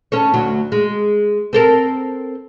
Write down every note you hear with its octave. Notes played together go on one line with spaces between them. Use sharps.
C#4 A4 C#5
D2 F#3
G#3
C4 A4 A#4